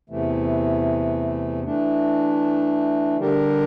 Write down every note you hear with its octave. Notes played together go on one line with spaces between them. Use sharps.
E2 C3 E3 A3
E3 A3 D4
D3 G3 D4 G4 A#4